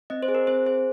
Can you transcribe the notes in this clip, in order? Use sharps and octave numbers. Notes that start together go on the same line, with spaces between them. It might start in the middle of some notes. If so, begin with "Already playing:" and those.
C4 D#5
C5
G#4
A#4
C4 C5
G#4 C5